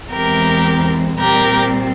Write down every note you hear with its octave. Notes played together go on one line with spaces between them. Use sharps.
E2 E3 G#3 C4 G4 A#4
A#2 G3 C4 G4 A#4